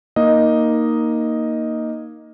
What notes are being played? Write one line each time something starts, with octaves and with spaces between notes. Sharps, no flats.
A#3 D#4 D#5